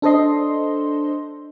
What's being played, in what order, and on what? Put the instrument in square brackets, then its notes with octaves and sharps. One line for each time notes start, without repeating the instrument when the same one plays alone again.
[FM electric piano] D4 A4 C5 D#5 C6